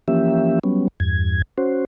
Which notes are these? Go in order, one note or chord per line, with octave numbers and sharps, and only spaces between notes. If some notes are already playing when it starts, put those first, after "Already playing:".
E3 F3 A#3 C#4 G4 E5
F#3 G3 B3 C#4
E2 G2 G#6
C#4 F#4 C5